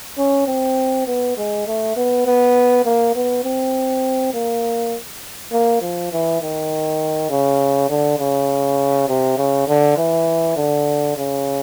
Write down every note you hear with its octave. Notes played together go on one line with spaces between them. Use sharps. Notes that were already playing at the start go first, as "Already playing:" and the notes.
C#4
C4
B3
G#3
A3
B3
B3
A#3
B3
C4
A#3
A#3
F3
E3
D#3
C#3
D3
C#3
C3
C#3
D3
E3
D3
C#3